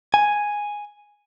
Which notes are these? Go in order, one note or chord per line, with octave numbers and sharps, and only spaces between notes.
G#5